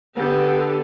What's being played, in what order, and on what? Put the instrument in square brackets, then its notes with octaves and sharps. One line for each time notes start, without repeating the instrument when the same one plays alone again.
[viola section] D3 G4 A4 [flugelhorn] B3